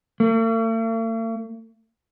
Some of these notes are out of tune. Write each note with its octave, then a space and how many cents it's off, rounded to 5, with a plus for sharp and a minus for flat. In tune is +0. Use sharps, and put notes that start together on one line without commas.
A3 +45